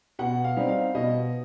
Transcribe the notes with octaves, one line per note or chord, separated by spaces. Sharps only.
B2 F#5
F5
G3 C4 D#4
F5
B2 D#5